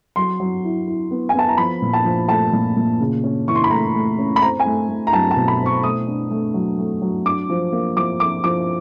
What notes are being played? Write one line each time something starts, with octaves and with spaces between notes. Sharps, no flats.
F#3 C6
F#3
E4
E4
B3
G#5
B3 A5
A#5
F3 B5
A#2
A5
F3
A3 A5
A#2
A#2
C#3
C#4
E3 C#6
C6
B5
A3 A#5
A3
C#4
B5
C4 A#5
G#5
A3
A3
A#5
F#3 A5
A5
B2
B5
C4
C#6
A3 D#6
D4
A3
F#3
A3
F#3
D4 D6
F3
A#3
F3 D6
F3 D6
F3 D6